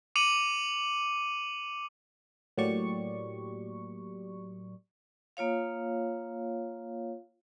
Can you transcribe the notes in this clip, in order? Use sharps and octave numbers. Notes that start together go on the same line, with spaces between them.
D6 C#7 D#7 F7 F#7
A2 F#3 A#3 G4 D5 C#6
A#3 F4 C#5 F5